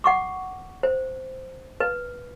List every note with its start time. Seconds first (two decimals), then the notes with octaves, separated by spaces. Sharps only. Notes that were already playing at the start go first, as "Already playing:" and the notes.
0.04 F#5 C#6 D6
0.83 C5
1.80 B4